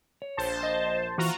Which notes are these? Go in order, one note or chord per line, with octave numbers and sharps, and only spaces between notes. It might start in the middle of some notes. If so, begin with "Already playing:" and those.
C#5
A#1 C5 A5
D#5
E3 F4 F#4 A#5